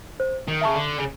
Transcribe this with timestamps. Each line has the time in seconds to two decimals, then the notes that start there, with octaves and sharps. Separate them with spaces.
0.20 C5
0.48 D#3
0.61 C#3 E5 A5 C#6
0.75 D3
0.99 C#3